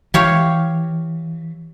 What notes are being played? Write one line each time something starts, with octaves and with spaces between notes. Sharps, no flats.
E3 G4 C#5 F5